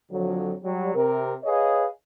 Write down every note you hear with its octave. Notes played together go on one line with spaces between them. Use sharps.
F2 D3 F3 F#3
F#3 G3
C3 A#4
G#4 B4 C#5 D#5 F5